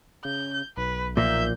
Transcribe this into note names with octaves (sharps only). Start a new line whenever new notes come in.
C#3 G6
B1 B4
A#2 F3 A#3 E5 G6